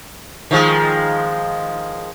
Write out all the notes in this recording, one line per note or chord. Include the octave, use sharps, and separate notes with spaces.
D#3 F3 G#3